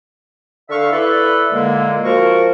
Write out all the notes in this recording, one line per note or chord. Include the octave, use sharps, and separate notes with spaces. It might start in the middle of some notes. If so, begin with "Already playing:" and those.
D3 E5 F5 C#6
E4 A4 B4 D5
A#2 D3 G#3 A#3
F3 F#4 A#4 C#6